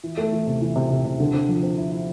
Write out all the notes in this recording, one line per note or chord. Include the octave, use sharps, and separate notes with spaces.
E3
A3
E3
C3
E3
C3
C3
C3
D3
C4
F3
C4
E4
E4